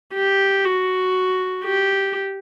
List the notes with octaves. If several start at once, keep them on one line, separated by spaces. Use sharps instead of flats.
G4
F#4
G4